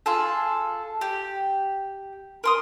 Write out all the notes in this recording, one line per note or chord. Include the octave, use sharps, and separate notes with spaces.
F4 G#4 A4
G4
A#4 C6 D#6